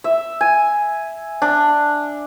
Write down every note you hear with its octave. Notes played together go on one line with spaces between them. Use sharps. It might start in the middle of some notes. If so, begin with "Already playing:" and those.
E5
G#5
D4